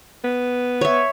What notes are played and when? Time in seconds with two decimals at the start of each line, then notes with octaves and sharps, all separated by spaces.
0.24 B3
0.81 C#5 E5